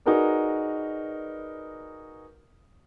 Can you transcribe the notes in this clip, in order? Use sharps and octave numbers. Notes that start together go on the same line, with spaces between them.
D#4 F#4 G#4 A#4 B4 D5